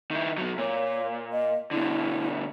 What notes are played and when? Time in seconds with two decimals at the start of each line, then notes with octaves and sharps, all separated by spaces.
0.11 D#3 E4
0.38 B2 F#3
0.58 A#2 C#5
1.32 D#5
1.71 B2 D3 E4